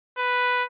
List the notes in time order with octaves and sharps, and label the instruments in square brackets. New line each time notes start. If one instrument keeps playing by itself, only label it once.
[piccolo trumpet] B4